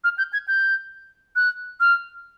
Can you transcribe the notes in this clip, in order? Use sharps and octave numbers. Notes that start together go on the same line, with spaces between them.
F6
G6
G#6
G6
F#6
F6